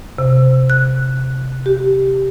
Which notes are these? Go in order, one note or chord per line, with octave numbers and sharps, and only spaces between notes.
C3
F#6
G4